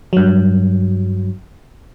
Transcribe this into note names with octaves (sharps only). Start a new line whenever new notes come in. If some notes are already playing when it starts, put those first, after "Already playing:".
G2 F#3